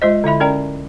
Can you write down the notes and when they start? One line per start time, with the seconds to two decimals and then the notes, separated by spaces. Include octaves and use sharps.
0.02 G#3 F4 C5 D#5
0.24 D3 E4 E5 B5
0.40 C#4 A#4 D5 G5 A#5